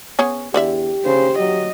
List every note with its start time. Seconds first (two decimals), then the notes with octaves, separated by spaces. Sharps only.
0.19 B3 C#4 G#4
0.54 E2 D3 G4 D5 E5
1.05 C#3 C5
1.39 F#3 D#5